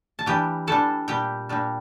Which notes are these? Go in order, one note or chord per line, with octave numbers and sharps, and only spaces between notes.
A5
E3 G3 D4 G4 G5
E3 G3 D4 A4 A5
A#2 G3 D4 G4 G5
A#2 G3 D4